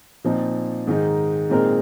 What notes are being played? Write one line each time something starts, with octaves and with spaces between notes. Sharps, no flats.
A#2 F3 C4 D#4
G#2 D#3 G#3 D#4
A#2 G#3 C4 D#4 A#4